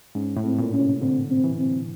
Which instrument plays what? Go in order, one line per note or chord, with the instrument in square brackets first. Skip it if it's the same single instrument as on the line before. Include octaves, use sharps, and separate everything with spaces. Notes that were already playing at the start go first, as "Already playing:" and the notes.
[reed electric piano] G#2 [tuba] C#4
[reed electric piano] A2
[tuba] C4
[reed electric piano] A#2
[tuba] C#4
[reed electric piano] C3
[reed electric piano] D3 [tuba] C4
[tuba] C4
[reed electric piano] E3
[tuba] C4